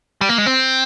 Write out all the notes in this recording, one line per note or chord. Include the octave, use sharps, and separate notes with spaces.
G3
A#3
G#3
C4